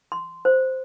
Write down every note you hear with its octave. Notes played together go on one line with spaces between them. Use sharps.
C6
C5